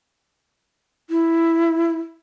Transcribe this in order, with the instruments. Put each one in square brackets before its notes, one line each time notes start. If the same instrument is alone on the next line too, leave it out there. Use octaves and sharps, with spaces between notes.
[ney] E4